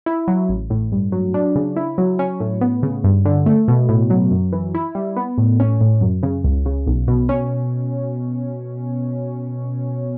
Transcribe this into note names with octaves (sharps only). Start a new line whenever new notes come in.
E4
F#3
A1
A2
G2
F#3
D4
C#3
E4
F#3
C#4
A2
B3
C#3
G2
D3
A3
B2
A2
F#3
F#2
E3
E4
G3
B3
A2
C#4
A2
F#2
C#3
C#2
C#3
B1
B2
C#4